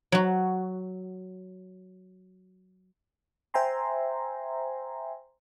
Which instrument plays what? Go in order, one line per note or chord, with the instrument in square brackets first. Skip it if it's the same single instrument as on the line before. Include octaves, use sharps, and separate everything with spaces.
[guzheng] F#3 F#4
[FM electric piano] C5 E5 G5 G#5 A#5 C6